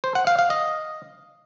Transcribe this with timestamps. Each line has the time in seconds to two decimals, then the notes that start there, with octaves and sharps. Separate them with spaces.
0.04 C5
0.15 F#5
0.27 F5
0.39 F5
0.50 D#5